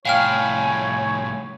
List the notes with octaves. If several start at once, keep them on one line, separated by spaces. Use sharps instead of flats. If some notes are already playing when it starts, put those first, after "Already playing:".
C2 A2 C#5 F5 G5 G#5 F6